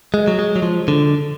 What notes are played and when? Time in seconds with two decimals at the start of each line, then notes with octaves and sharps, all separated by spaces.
0.14 G#3
0.28 F#3
0.39 G#3
0.56 F#3
0.62 F3
0.88 D3